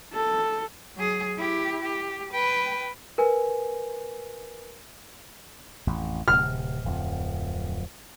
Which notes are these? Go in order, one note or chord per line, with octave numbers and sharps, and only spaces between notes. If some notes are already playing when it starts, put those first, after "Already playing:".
A4
F#3 G#4
E4 G4
G4
B4 G5
A#4 B4 G#5
A1 F2
D1 C3 F6
D1 F2 F3